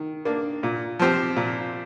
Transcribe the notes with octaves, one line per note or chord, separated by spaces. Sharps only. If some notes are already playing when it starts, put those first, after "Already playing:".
Already playing: D#3
A#3 D4
A#2
F3 C4 G4
A#2